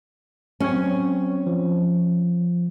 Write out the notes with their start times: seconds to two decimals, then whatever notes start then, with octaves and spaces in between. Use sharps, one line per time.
0.60 F#3 C4 C#4 C#5
1.46 F3